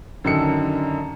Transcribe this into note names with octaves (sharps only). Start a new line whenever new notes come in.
F#2 D3 D#3 A5 E6 C#7